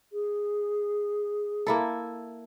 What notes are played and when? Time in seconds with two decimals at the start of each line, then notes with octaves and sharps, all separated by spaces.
0.13 G#4
1.67 A#3 E4 A4